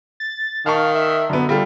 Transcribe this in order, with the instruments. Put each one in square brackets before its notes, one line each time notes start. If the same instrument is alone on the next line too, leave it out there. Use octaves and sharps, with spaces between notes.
[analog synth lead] A6
[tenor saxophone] D#3 [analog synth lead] F5 [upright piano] A5 C#6
[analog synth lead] E5
[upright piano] F#2 B3 [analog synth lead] D3
[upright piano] G3 F4 A4